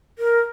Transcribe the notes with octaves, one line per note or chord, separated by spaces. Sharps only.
A#4